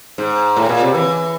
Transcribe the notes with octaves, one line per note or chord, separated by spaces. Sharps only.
G#2
A2
A#2
C3
E3